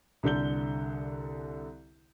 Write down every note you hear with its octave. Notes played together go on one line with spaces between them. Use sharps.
C2 D3 A4 G6 G7